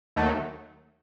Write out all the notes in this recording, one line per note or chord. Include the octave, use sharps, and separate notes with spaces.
D#2 D#3 F#3 A3